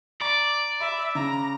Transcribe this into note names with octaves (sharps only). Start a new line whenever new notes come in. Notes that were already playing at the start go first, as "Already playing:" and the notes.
D5 A#5 C#6
E5 B5
C#3 A#5